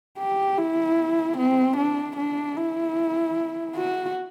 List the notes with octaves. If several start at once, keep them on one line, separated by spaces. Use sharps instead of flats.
G4
E4
C4
D4
D4
E4
F#4